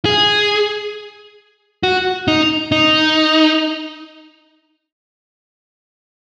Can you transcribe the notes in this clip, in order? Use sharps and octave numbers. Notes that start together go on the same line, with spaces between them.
G#4
F#4
D#4
D#4